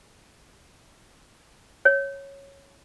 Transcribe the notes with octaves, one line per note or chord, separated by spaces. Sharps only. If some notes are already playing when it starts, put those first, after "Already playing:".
C#5